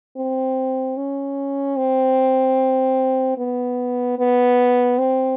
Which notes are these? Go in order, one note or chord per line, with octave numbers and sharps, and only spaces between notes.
C4
C#4
C4
B3
B3
C4